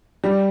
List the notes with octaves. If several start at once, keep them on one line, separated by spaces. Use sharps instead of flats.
G3